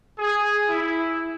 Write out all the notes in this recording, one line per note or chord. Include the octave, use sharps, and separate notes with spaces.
G#4
E4